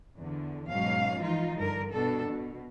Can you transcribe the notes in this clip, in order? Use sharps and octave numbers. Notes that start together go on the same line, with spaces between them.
E2 D3
G#2 B2 F#3 C#4 F5
E3 F3 D#4 F4
G2 D3 A#4
B2 D4 A4
B2